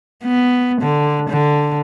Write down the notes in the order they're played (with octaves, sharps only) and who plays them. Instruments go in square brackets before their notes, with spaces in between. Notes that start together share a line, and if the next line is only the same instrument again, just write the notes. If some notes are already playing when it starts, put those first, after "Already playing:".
[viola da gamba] B3
D3
D3